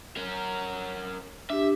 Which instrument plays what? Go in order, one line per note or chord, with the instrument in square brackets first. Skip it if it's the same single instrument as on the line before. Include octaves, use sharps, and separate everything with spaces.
[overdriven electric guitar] C#4 A#4
[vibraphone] D4 G4 [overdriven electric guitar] E5